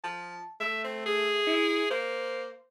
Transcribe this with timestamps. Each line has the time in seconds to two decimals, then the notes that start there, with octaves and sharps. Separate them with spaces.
0.04 F3 A5
0.60 A3 E5
0.84 C4
1.06 G#4
1.47 E4
1.91 A#3 C5